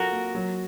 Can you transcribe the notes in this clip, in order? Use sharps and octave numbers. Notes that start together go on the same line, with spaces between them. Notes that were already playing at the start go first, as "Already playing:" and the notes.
Already playing: F#3 F4 F#4 A4 A#4
A#3
F#3